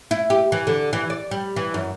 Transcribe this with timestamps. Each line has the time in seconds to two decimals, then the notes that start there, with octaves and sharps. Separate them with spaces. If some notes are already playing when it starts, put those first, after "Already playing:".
0.11 E4
0.30 G4
0.52 E3
0.67 D3
0.93 E3
1.10 D5
1.31 G3
1.56 E3
1.74 F#2